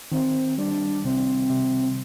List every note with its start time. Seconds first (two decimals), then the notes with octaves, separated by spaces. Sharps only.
0.12 D#3 C4
0.58 G3 D4
1.05 C3 C4
1.50 C3